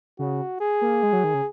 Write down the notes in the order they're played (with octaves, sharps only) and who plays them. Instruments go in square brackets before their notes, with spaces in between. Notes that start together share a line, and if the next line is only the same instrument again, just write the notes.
[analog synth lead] C#3 [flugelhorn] F#4
[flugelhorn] G#4
[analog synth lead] A#3
G#3
F#3
D#3
C#3